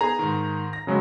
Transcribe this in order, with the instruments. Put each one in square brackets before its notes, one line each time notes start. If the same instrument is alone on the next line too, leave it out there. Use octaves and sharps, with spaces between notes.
[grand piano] B3 D#4 G#4 [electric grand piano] A#5
[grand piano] G#2 D#3
A#6
[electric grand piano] C#3 F#3 G#3